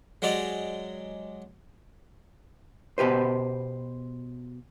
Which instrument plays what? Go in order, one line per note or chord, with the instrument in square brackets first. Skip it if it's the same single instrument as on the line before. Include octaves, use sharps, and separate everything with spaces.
[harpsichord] F#3 G#3 G4 D5 D#5
[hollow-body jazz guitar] B2 G4 B4 C5